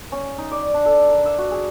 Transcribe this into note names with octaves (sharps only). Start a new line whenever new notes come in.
C#4
D#4
D5
D4
A4
A#4
E5
F#4
G#4